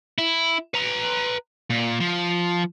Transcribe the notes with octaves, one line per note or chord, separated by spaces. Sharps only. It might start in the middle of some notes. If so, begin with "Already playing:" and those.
E4
B4 A#5
A#2
F3